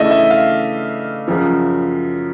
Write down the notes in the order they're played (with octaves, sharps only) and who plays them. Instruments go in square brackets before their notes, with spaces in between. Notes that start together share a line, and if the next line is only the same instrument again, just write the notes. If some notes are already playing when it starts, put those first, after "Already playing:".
Already playing: [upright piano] C#3 E3 A3 D4 [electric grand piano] D#5 E5
[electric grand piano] E5
F5
[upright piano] F#2 C#3 F3